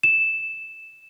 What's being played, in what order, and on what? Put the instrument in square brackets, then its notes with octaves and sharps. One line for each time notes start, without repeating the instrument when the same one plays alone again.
[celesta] E7